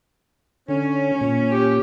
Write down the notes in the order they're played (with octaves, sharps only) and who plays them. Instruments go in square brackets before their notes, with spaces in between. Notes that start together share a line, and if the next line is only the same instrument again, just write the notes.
[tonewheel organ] D3 [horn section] C#4
[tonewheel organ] A#2
[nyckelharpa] G4